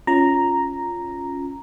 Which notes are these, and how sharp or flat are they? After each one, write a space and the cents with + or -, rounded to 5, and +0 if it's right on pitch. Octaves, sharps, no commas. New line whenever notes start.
C#4 +0 F4 +0 A#5 +0